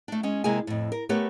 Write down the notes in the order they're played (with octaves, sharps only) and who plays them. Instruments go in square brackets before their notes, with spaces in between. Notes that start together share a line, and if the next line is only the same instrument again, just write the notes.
[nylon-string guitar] A3 D4
G#3 C#4
C3 G#3 A#3 E4 G#4 G#5
F2 A2
A#4
A3 B3 G4 A#4 B4 C#5